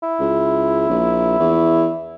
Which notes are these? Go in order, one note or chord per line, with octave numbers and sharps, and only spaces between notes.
E4
C#2
A#1
E2